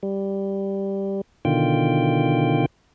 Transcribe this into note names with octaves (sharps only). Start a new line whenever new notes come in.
G3
B2 D3 D#3 F4 G5